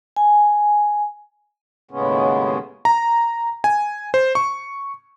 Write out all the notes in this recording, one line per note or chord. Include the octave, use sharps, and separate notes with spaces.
G#5
D#2 A2 C#3 G#3 B3 C#4
A#5
G#5
C5
C#6